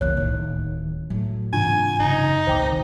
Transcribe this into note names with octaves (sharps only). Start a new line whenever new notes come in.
F1 C2 E3 A#3 C#5 F#6
D1 A2 D#3
A2 F#3
G#2 C3 E3 D4 F4 G#5
F#2 C#3 D#4
G#1 C#2 B2 D#3 C5 G5 D6